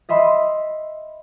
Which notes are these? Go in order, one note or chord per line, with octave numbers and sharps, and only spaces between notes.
D#5 E5 B5 C6